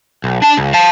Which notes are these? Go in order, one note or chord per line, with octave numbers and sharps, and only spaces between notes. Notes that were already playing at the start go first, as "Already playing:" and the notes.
B1
D4 A5
C#2
F5 A5